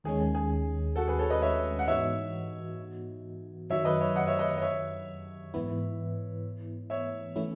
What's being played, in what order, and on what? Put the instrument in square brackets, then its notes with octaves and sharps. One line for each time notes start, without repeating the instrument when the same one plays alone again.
[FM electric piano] D#2 D#3 G#3 C#4 [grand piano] G#4
[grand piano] G#4
G#4
F#4 A4
G#4 B4
A4 C#5
B4 D#5
C#5 E5
F#5
[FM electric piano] G#2 E3 B3 D#4 F#4 [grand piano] C#5 E5
[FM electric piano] F#2 D#3 F#3 [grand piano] C#5 E5
[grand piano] B4 D#5
C#5 E5
D#5 F#5
C#5 E5
B4 D#5
D#5
C#5 E5
[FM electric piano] G#2 E3 B3 E4
[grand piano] C#5 E5
[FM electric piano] E3 A3 C#4 E4